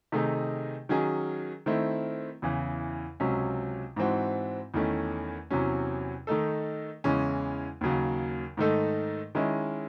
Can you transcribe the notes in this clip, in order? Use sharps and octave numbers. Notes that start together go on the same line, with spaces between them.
C3 D#3 A3 D#4 G#4
D#3 F#3 C#4 G#4
D#3 A3 C4 E4
E2 C#3 E3
C#2 C3 F#3 C#4
G#2 E3 C4 F#4
E2 D#3 A3 C#4
E2 C3 F#3 C#4
D#3 A3 D#4 A4
E2 C#3 E3 G#3 C#4
D#2 C#3 F#3
G#2 D#3 A3 D#4 A4
D#3 G#3 C#4 E4